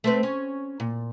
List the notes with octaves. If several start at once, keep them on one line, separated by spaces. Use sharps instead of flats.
A3 C4 B4
C#4
A#2